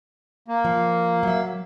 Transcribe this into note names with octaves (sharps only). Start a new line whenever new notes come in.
A#3
F3
F#3 E5